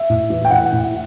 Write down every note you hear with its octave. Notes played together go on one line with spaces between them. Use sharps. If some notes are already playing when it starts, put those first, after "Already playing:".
Already playing: E5
A2
E3
G5
A2 F#5
A2